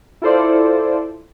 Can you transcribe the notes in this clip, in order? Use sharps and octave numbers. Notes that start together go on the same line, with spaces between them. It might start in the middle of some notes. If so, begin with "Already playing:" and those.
E4 F4 A4 C5 D5